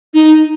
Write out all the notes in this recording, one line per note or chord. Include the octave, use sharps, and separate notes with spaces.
D#4